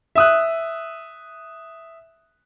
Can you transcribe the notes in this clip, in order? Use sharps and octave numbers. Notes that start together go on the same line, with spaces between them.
E5 D#6 F#6